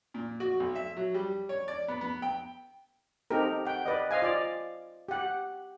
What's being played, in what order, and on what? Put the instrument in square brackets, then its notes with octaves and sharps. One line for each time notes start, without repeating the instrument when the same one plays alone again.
[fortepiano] A#2
F#4
B1
E5
F#3
G3
C#5
D5
B3
B3
G5
[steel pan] C4 D#4 G4 A4 A#4
F#5 G5
B4 D5 D#5
C5 D#5 F5 G#5
F4 D5
G4 F#5